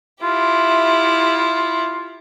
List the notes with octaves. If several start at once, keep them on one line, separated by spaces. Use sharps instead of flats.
E4 F4 G4